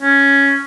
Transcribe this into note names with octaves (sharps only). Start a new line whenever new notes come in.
C#4